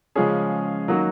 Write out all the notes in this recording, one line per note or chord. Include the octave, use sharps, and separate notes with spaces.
C#3 F3 G#3 C#4 G#4
D#3 F#3 A#3 D#4 F#4